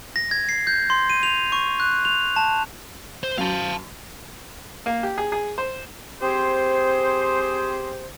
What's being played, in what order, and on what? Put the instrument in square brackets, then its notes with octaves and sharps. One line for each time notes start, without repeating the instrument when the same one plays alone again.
[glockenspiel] A#6
G#6
C7
G6
C6
D#7
F7
C#6
F#6
F7
A5
[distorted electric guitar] C5
[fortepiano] F#2 [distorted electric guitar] F5 A5
[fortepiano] A#3
G4
G#4
G#4
C5
[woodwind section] C4 G4 G#4 C5